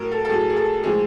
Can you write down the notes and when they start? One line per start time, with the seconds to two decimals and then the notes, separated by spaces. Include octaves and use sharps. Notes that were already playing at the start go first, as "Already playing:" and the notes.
Already playing: A2 F#3 A#4
0.12 A4
0.25 A4
0.29 A2 F#3 G#4
0.49 G#4
0.57 A4
0.83 A2 F3 G#3 G#4